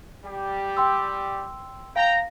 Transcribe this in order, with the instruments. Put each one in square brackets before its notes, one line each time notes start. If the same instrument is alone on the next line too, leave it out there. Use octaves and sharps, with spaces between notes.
[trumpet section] G3 G4
[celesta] G5 C6 E6
[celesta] F5 A#6 [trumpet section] G5 A#5